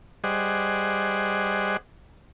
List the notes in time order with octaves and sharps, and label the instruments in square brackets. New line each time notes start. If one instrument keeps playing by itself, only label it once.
[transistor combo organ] G3 G#4 C5 D5 D#5 F#5